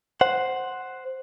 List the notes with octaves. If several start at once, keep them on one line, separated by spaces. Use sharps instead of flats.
C5 F#5